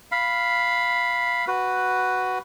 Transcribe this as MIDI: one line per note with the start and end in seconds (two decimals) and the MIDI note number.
0.12 1.45 77
0.12 1.45 83
1.48 2.39 66
1.48 2.39 71